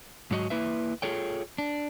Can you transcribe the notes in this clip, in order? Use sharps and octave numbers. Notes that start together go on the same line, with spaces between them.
G#2 F#3 F#4 D#5
A#3 E4 B4 E5
F4 G#4 A4 C#5 G5
D4